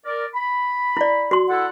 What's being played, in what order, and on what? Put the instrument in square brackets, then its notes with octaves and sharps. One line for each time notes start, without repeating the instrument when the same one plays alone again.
[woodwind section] A#4 D5
B5
[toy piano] E4 D5
F#4 C6
[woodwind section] E4 A4 F#5